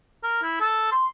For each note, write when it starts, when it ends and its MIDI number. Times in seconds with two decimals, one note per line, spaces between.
0.23 0.42 70
0.43 0.55 64
0.60 0.91 69
0.92 1.06 84